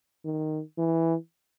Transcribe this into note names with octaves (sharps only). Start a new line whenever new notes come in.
D#3
E3